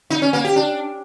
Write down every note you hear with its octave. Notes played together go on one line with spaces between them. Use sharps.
D#4
C#4
A#3
G4
D4